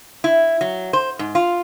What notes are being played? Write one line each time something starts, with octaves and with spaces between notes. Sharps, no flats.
E4
F#3
C5
G#2
F4